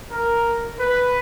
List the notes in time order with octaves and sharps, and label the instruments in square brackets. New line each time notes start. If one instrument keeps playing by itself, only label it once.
[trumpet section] A#4
B4